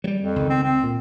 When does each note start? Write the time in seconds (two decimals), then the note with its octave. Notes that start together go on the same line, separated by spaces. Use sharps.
0.04 F#3 G3
0.21 F2
0.36 C#2 D#3
0.49 C4
0.63 C4
0.84 A#2